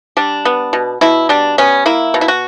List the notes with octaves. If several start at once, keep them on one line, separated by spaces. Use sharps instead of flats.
G3 D4
B3
B2
B2 E4
G3 D4
B3 C#4
A#3 E4
B2
E4
F#4